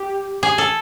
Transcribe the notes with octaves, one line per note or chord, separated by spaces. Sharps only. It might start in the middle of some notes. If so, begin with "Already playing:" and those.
Already playing: G4
G#4
A4